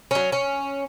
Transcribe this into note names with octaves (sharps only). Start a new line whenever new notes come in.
F#3 C#4
C#4